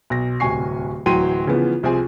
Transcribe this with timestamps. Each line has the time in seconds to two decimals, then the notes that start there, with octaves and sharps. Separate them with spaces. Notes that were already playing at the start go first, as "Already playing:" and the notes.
0.10 B1 A#6
0.40 D1 C2 G#5 C#6 C7
1.06 D1 E3 F#3 G5 C6 D#7
1.47 C#3 E3 F3 B3
1.83 C2 F3 C4 G#4 G#5